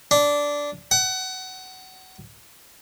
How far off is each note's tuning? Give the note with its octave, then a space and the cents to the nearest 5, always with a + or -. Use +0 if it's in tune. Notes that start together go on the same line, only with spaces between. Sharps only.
D4 -10
F#5 +25